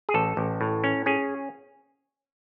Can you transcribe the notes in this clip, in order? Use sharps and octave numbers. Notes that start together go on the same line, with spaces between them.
G#4
A1 A4
A1
A2
C#4
C#4 G#4